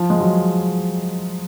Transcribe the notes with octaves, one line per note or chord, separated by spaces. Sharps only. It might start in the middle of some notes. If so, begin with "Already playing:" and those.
Already playing: F3
G#3
F#3